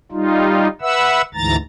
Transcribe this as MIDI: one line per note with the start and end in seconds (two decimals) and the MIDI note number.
0.12 0.68 55
0.12 0.68 63
0.12 0.68 65
0.81 1.21 71
0.81 1.21 76
0.81 1.21 78
0.81 1.21 88
1.34 1.56 38
1.34 1.56 44
1.34 1.56 52
1.34 1.56 82
1.34 1.56 93